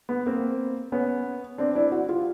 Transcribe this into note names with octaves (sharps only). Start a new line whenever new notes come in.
B3
A#3 C4
B3 C#4
C4 D4
D4 E4
E4 F#4
F4 G4